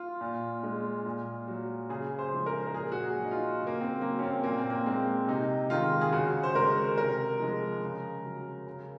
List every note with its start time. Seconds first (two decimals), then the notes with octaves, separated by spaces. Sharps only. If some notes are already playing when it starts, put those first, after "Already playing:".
Already playing: F4
0.21 A#2
0.63 G#3
1.06 A#2
1.48 F#3
1.89 C#3 G#4
2.19 C5
2.32 F3 G#3
2.46 A#4
2.67 A#4
2.74 A#2 G#4
2.92 F#4
3.03 G#4
3.17 F#3
3.24 D#4
3.31 F4
3.59 C#3
3.67 A#3
3.80 C4
4.01 F#3 A#3
4.19 C#4
4.23 C4
4.43 A#2 A#3
4.58 C4
4.70 A#3
4.86 G#3 C4
5.28 C3 D#4
5.70 D#3 G#3 F4
6.01 G#4
6.12 C#3 F#4
6.43 C5
6.55 G#3 A#4
6.98 C3 A#4
7.40 F3 G#3
7.82 C#3
8.25 F#3
8.67 C#3